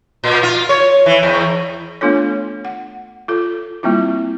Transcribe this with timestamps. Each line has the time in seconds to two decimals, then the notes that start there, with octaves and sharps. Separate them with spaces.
0.24 A#2
0.43 F4
0.69 C#5
1.06 E3
1.23 E2
2.01 A3 B3 D4 F4 A4 C#5
2.65 F#5
3.28 F4 A4
3.83 G3 A#3 C4 E4 F4